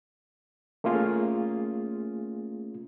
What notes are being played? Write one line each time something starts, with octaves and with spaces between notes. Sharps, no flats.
A3 A#3 C#4 F4 G#4